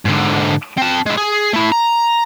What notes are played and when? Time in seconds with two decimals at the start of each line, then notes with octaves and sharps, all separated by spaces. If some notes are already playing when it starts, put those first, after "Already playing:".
0.05 G#2 D3
0.77 C4 A5
1.06 G#3 E4
1.17 G#4
1.54 A3 E4
1.72 A#5